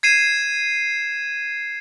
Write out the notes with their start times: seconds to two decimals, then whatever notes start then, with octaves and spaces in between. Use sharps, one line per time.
0.03 G#6 C7 D#7 E7